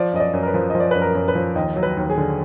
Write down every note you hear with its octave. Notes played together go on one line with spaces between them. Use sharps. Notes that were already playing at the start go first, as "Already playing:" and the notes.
Already playing: F3 D5
F#2 D#5
D5
F#2
A#4
B4
F3
F3 D#5
D5
F#2 B4
A#4
F#2
B4
F3
D#2 D#5
F#3
B4
D#2
G#4
D3